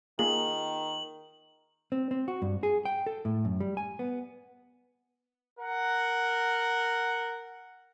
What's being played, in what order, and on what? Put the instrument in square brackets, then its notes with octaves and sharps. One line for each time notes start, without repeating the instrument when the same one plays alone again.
[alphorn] D#3 [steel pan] A#3 F4 G#4 [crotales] F#7
[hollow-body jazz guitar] C4
C4
F#4
G2
G#4
G5
A4
A2
F#2
G3
G#5
B3
[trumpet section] A#4 F#5